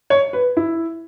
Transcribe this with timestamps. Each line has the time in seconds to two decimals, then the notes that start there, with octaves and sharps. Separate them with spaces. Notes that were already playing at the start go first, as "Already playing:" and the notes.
0.10 C#5
0.33 B4
0.57 E4